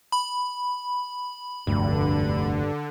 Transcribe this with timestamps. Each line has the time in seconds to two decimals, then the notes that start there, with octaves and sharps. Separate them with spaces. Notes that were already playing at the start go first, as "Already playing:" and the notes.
0.12 B5
1.67 F1 D2 G2 D3